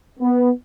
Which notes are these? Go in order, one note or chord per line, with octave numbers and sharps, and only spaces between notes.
B3